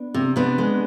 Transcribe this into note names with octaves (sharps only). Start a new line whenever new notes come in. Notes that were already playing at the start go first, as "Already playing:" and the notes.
Already playing: B3 D4
C3
C3 B3 D4
G#3